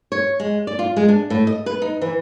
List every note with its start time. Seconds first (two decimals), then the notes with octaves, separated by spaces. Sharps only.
0.12 C#5
0.40 G#3
0.67 D5
0.79 F4
0.96 G#3
1.08 D4
1.30 A2
1.47 D#5
1.66 B4
1.82 D#4
2.01 E3